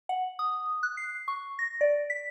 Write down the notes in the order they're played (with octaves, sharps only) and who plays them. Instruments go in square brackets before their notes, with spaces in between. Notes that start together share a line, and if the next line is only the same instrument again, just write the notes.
[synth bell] F#5
D#6
F#6
C7
C#6
A#6
D5
B6